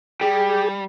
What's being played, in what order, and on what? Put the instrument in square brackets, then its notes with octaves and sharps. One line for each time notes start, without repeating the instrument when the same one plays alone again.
[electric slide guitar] G3 [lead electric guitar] G4 [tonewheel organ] G#4